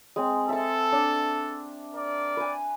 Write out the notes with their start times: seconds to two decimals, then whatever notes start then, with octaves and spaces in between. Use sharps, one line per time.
0.16 G#3 C4
0.49 A4 E5 A5
0.92 D4
1.95 A#4 D5
2.37 B4 G#5